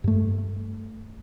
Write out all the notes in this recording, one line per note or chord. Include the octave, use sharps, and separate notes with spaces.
G2 A3